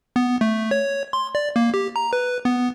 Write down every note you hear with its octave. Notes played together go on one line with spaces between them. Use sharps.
B3
A3
C#5
C6
D5
A#3
G4
A#5
B4
B3